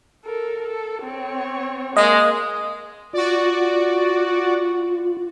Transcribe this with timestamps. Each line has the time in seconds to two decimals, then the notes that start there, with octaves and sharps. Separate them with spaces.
0.25 A4 A#4
0.62 A4
1.04 C4 C#5
1.97 G#3 A#3 D#5
3.13 F4 F#4 D5